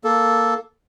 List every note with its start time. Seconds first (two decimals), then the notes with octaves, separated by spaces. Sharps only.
0.04 A#3 A4